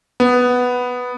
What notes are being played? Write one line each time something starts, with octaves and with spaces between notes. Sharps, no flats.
B3